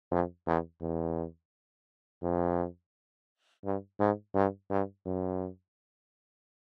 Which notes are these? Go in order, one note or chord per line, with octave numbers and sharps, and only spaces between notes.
F2
E2
E2
F2
G2
G#2
G2
G2
F#2